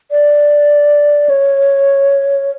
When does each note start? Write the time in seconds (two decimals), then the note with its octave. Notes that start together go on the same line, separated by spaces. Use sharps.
0.11 D5
1.29 C#5